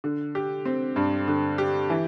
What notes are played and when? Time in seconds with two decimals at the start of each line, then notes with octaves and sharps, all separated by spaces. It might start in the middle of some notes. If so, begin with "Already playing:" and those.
0.04 D3
0.35 G4
0.65 C4
0.96 G2
1.28 D3
1.58 G4
1.90 E3